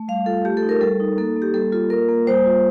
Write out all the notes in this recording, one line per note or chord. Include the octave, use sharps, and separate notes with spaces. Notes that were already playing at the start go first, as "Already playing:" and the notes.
Already playing: A3
G3 F5
F4 A4
A3 G4
A4
D#4
A#4
G3 A4
D#4
A#3 A4
A#3
G4
G3 A4
F4 A4
A#3 A#4
A#3
G3 C5
F4